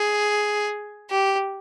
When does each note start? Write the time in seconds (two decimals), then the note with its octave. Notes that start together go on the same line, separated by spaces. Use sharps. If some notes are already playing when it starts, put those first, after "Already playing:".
Already playing: G#4
1.10 G4